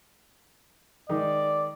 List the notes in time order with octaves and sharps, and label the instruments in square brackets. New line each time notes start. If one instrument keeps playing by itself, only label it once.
[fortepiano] D#3 G#3 D#4 [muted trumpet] D5